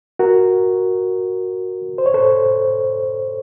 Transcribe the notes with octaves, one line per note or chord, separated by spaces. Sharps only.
F#4 A#4
C5
C#5
A4 C5